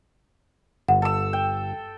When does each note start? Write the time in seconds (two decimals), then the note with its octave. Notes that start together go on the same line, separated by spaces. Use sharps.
0.88 G1 F#5
1.02 A4 E6
1.33 G5